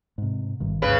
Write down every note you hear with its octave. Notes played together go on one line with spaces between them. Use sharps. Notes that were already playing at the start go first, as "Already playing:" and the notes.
G#2 C3
G#1 G2 D#3
D#2 G#2 C#3 B4